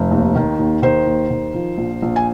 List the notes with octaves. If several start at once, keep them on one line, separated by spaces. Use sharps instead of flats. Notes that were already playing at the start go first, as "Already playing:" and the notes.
Already playing: F1
D#2
D#3
D#2
D#3 C5
D#2
D#3
F3
A#1
A#1
G#5